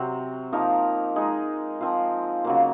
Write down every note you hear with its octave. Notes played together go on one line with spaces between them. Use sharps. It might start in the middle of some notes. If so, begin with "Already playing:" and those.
Already playing: C3 F#3 C4
F3 A#3 D#4 A#4
G#3 D#4 G#4
F3 C4 F4
C#3 F#3 A#3